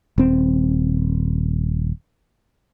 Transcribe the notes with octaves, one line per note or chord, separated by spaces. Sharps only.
D#1 C4